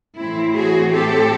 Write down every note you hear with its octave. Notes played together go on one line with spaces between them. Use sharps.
A2 E3 A3 C4 E4
F#4 G#4
G4 A4